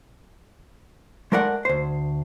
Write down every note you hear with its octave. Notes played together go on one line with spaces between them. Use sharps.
G#3 A3 A#4 D5 E5 F#5
D2 C5